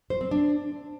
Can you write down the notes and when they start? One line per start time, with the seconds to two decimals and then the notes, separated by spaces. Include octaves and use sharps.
0.10 C5
0.21 C4
0.31 D4